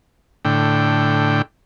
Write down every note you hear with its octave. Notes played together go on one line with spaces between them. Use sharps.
A2 D3 G5